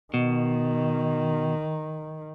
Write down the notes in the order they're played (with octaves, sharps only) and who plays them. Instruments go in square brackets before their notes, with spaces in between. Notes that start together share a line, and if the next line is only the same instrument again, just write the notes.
[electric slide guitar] B2 [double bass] D#3